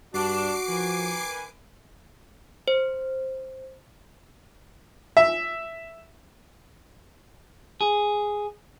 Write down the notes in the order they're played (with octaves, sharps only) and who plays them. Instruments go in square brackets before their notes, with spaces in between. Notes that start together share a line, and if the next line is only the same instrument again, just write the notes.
[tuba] G2 [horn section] D4 [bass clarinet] F#4 [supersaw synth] D6 C7 D7
[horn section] D#3 B4 G#5 [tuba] F3
[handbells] C5
[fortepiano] E5
[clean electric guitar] G#4